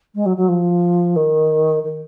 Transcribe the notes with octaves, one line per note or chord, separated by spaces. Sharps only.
G#3
F#3
F#3
F3
D#3
D#3